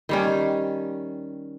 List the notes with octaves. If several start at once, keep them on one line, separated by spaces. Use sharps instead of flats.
D#3 G3 C#4